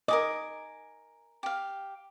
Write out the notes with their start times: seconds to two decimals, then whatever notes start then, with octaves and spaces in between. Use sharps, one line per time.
0.08 A#4 D#5 G#5 D6
1.43 G4 F5